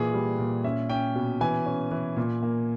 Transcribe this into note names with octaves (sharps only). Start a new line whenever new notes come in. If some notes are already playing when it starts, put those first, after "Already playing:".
Already playing: A#2 E3 G#4
G3
A#2
C#4 E5
C#4 G5
B2
E3 G#5
C#4
E3
A#2
A#3